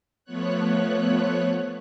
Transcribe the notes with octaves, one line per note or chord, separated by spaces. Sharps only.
F3 A3 B3 C#5 F#6